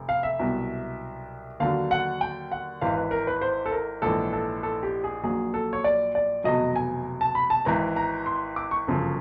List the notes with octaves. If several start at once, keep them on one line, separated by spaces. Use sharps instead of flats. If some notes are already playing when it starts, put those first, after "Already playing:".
Already playing: F1
F5
E5
C2 B2 F#3
D#2 D3 F#3 F5
F#5
G5
F#5
G#1 G#2 E3 F5
B4
A#4
B4
C5
A4
A#4
A#1 G#2 E3 A4
A4
A4
G4
G#4
A#1 A#2 F#3 G#4
A4
C#5
D5
D5
F1 E2 B2 F#3 D#5
G#5
A5
B5
A5
G#1 G#2 E3 A#5
A#5
C6
D6
C#6
G1 F#2 C#3 F3